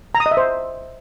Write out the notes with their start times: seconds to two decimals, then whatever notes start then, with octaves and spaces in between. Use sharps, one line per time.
0.15 A#5
0.20 D#6
0.26 D#5
0.31 E5
0.37 C5